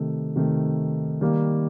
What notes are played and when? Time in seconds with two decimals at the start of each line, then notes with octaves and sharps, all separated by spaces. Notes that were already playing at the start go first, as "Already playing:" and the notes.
Already playing: C3 D#3 A3
0.36 C3 D#3 A3
1.21 D#3 G3 A#3